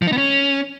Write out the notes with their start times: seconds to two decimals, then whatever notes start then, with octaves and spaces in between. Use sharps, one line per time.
0.02 F3
0.07 D#4
0.12 B3
0.18 C#4